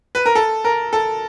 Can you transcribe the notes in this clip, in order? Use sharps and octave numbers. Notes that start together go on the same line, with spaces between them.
B4
A#4
A4
A#4
A4